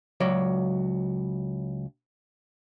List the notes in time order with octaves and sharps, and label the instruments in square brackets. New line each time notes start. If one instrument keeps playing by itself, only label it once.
[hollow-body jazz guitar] C#2 F#3 D5